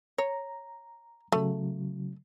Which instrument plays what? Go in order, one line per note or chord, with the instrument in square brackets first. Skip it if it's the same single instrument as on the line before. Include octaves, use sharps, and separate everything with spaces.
[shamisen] C#5 [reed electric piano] A#5
[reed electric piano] C#3 F#3 [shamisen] A3